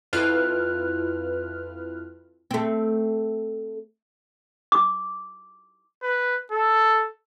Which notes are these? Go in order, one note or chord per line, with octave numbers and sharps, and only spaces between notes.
F2 E4 F4 B4 F6 F#6
A3 C4
D6
B4
A4